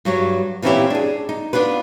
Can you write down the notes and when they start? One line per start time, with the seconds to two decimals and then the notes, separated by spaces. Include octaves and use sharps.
0.05 G2 F#3 G4 C#5
0.62 A#2 E3 C4 C#4 E4 G4
0.90 D4 G#4
1.29 D#4
1.53 B3 D4 F4 G#4 B4